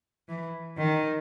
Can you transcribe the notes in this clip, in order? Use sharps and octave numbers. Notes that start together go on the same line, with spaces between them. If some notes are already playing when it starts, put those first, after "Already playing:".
E3
D#3